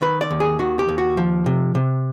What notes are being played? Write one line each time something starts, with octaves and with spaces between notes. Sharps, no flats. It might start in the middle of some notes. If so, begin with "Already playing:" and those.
D#3 B4
D5
D#2
G#4
D#3 F#4
G4
D#2
F#4
F3
C3
C3